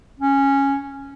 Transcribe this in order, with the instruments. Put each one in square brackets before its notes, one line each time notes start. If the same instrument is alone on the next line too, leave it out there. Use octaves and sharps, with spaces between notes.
[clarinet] C#4